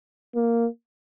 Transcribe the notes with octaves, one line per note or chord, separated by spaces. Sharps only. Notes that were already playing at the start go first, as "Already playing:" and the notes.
A#3